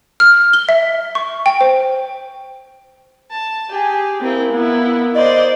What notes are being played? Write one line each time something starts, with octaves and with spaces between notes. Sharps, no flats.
F6
G7
E5
C#6
G5
C5
A5
G4 G#4
A#3 C4 E4
B3 E4
C5 D5 D#5